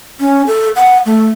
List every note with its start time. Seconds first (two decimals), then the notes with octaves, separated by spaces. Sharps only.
0.20 C#4
0.47 A4
0.76 F#5
1.06 A3